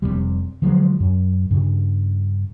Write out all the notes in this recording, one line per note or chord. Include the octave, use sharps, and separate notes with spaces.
F1 C#2 C3 G3
D3 F3 F#3 G#3
F#2
G2 C#3